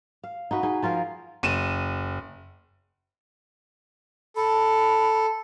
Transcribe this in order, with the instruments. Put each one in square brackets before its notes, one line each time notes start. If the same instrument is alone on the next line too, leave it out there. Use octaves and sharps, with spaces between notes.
[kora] F5
D#4 F#4 B4
D#4 G#4
F3 F4 A#4 F5
[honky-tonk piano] F#1 D#7 E7
[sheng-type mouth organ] A4 [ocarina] B5